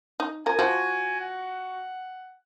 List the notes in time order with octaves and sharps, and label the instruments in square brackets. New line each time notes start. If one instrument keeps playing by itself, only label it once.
[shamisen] D#4
[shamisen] F3 A#4 [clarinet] G#5
[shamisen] F3 [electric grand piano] F#4
[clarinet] F#5